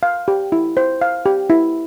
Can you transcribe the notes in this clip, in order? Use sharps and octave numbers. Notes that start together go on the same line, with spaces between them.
F5
G4
E4
C5
F5
G4
E4